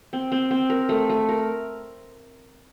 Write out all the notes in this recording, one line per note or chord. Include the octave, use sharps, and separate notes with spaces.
C4
C4
C4
A#4
A3
A3
A#4